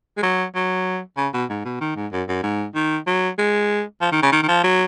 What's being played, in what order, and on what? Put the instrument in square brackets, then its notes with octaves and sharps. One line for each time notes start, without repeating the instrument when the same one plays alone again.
[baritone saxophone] G#3
F#3
F#3
C#3
B2
G#2
B2
D#3
G#2
F#2
F#2
G#2
D#3
F#3
G#3
F3
D#3
C#3
D#3
D#3
F3
F#3